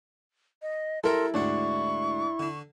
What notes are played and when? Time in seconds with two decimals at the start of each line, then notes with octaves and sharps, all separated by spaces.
0.62 D#5
1.04 G3 E4 A4 A#4 E5 A#5 C6
1.34 D2 G#2 D4 F#5 C#6
2.40 D3 D4